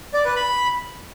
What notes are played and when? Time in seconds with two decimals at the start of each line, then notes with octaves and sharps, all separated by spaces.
0.14 D5
0.25 B4
0.36 B5